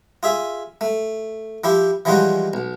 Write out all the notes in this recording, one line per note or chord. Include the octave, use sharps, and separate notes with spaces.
F4 G#4 E5
A3
F3 E4 G4
E3 F3 G3 G#3 F4 F#4
B1